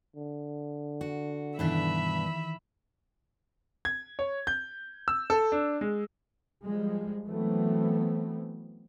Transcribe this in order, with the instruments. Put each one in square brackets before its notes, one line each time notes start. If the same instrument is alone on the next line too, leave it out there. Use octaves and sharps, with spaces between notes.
[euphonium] D3
[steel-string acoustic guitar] F#4
[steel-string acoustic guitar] G2 B2 D4 [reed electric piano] D#3 E3 [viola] E5 B5
[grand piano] G#6
C#5
G6
E6
A4
D4
G#3
[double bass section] F3 G3 G#3
E3 F#3 A3 B3 C4